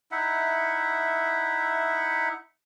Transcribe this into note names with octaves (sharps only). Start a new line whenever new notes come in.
D#4 E4 E5 F#5